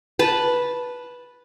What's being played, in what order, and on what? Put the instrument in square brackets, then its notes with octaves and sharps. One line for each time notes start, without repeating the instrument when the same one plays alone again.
[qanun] B4 A5